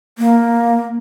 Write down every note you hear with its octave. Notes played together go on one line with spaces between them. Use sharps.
A#3